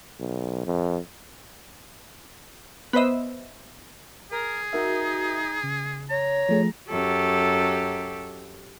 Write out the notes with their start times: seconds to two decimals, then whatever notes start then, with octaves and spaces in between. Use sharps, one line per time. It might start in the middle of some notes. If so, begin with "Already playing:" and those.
0.20 B1
0.66 F2
2.93 B3 B4 C5 D#5 E5
4.31 G#4 A#4
4.73 D#4 F#4 A#4 E5
5.63 C#3
6.10 C#5 A#5
6.49 F3 A3 G#4
6.89 F#2 G4 A4